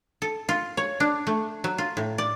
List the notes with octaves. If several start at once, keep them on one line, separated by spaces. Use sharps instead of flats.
A4
F4
C#5
D4
A3
F#3
F4
A2
D5